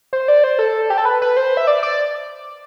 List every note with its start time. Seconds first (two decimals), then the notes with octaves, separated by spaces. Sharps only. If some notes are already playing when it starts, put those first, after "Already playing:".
0.13 C5
0.28 D5
0.44 C5
0.59 A4
0.90 G4
0.98 A4
1.05 B4
1.22 B4
1.37 C5
1.57 E5
1.67 D5
1.83 D5